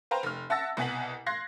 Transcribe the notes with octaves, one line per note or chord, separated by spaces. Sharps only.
B4 C5 F5 G5 A#5
F1 F6
E5 F#5 A5 E6 A6 A#6
C2 B2 F#5 G#5 B6 F#7
F5 C6 F#6 G#6 A#6 C7